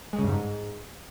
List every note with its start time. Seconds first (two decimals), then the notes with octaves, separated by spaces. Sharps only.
0.13 G#3
0.18 C#3
0.24 G2
0.29 G#2